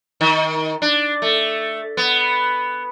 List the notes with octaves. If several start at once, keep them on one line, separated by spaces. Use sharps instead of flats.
D#3
D4
A3
B3